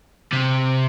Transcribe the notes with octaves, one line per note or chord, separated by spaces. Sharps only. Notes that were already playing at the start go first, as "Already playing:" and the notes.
C3